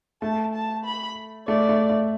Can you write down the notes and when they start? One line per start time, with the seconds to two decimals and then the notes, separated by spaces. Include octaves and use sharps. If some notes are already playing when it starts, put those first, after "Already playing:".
0.22 A3 A5
0.54 A5
0.85 B5
1.47 A3 D5
1.69 A3
1.89 A3